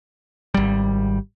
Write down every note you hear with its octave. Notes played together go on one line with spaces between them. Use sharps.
G#1 G3